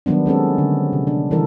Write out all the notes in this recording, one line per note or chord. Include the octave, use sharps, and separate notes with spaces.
D#3 F#3 G3 B3 D4
G#3 C4 C#4 A4
D3
C3
D4
D#3 E3 G3 A4 A#4